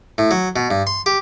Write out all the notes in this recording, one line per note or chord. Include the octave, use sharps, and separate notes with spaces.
A2
F#3
B2
G2
C6
G4